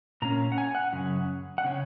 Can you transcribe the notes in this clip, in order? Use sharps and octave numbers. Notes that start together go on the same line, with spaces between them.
A#2 A#3 C#4 A#5
F#5
G#5
F#5
F#2 C#3
F#5
C#3 C#4